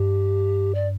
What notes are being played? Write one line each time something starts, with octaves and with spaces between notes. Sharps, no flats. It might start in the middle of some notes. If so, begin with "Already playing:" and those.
Already playing: G2 G4
D5